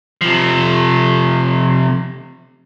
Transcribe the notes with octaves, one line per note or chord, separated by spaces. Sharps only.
C3 F3